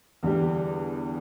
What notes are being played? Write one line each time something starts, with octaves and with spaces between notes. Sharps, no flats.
E2 D3 G3 D4 G4